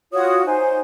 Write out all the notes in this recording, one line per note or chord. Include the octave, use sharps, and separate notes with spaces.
F4 F#4 C#5 D#6
D#4 C5 G#5